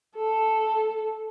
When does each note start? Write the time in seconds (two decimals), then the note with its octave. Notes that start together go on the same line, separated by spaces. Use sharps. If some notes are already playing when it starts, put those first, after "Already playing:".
0.16 A4